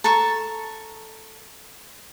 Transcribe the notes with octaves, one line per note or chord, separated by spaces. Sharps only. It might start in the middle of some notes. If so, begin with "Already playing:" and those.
A4 A5 A#5 C#6